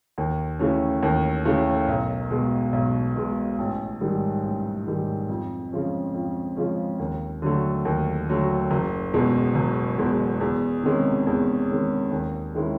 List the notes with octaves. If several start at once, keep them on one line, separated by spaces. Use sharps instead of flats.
D#2
C#3 E3 A3 C#4
D#2
C#3 E3 A3 C#4
B1
B2 G#3
B1
B2 G#3
A1
G#2 D#3 G3
A1
G#2 D#3 G3
F2
C#3 F3 G#3 C#4
F2
C#3 F3 G#3 C#4
D#2
D3 F#3 A3
D#2
D3 F#3 A3
F#1
E2 B2 G#3
F#1
E2 B2 G#3
E2
C3 D#3 G#3 C#4
E2
C3 D#3 G#3 C#4
D#2
D#3 G#3 C#4 E4